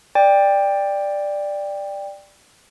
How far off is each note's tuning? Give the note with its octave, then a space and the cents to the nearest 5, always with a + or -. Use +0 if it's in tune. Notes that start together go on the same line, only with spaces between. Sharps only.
D5 +5 G5 +15